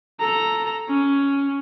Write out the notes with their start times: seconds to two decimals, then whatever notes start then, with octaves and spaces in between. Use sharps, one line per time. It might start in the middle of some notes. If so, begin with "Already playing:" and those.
0.20 A4 A#5
0.88 C#4